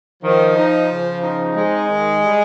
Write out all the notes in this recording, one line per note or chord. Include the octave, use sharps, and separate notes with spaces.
D#3 F3
D#4
C#3
D#4
G#3 C4
D#3
G3